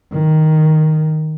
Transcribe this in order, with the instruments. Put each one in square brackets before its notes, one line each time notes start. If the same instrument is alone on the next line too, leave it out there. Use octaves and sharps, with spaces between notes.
[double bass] D#3